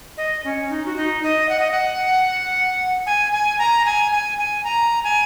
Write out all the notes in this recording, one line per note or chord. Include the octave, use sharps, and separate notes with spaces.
D#5
C#4
D#4
F#4
D#4
D#5
F#5
D#5
F#5
G#5
G#5
A#5
G#5
G#5
G#5
A#5
G#5